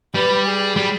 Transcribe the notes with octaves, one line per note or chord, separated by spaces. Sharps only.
G3 B4
G#4
G3